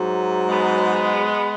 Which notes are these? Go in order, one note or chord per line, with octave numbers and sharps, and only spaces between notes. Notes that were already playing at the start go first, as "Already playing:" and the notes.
Already playing: G#2 F#3
G#3 B3